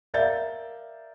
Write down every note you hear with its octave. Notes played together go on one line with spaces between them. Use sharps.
A#4 D5 E5 F5 G6 A6